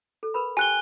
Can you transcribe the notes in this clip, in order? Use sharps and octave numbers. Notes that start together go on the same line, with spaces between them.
A4
A#4 B4 B5
G4 G5 G#5 F#6 G7